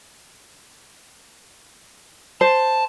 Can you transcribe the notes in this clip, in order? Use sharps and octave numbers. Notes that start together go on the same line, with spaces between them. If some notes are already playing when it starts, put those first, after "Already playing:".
C5 A5